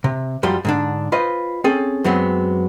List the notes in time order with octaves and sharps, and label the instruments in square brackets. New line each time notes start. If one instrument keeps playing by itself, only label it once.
[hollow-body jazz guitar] C3
F#2 F3 G3 C6
G#2 D3 D4
F4 B4 C5 D#5
C4 C#4 G#4 A4
F#2 F#3 G#3 B3 C4